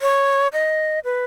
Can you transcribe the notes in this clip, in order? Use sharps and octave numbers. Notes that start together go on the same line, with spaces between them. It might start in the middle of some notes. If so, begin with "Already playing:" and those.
C#5
D#5
B4